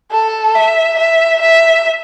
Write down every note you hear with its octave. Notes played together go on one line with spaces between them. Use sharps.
A4
E5
E5
E5